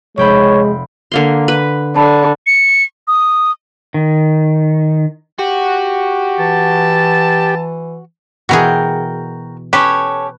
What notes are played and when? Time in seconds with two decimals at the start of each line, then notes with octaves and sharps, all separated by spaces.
0.17 F1 G#3 C#5 G5 B5
1.12 D3 A#3 C6
1.48 B4
1.96 D3 A5 B5
2.47 C#7
3.08 D#6
3.94 D#3
5.39 F#4 G4
6.39 E3 A5
8.49 B2 E3 F#4 G#4 A#4 G5
9.73 C#4 G4 A4 B4 C#5